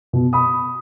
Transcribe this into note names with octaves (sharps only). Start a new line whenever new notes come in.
B2
B5 D#6